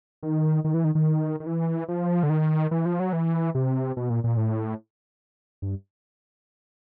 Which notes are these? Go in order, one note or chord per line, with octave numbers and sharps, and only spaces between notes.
D#3
D#3
E3
D#3
D#3
D#3
E3
F3
D3
D#3
E3
F3
F#3
E3
C3
B2
A#2
A#2
A2
G2